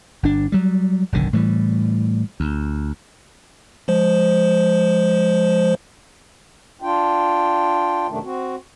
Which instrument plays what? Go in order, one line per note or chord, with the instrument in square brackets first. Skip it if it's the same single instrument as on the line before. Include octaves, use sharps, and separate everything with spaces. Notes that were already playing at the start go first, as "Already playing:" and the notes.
[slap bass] G1 D4
F#3 G3
F#1 B1 D3 D#3
A2 E3 G3
D2
[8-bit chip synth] F3 G#3 C5
[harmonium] D4 F4 G5
F#2 C3 D#3 A3 D4
C4 F#4